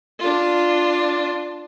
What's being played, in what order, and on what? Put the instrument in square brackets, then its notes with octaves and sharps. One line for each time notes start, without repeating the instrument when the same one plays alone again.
[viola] D4 F4